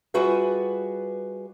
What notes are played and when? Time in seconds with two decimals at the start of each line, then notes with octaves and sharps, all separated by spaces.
0.14 G3 F4 F#4 G#4 B4 E5